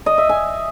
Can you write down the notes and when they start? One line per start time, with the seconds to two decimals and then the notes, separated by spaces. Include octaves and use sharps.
0.06 D#5
0.18 E5
0.29 G#5